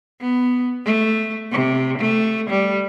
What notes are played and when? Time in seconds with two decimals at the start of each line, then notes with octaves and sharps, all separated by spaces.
0.21 B3
0.86 A3
1.52 C3
1.98 A3
2.49 G3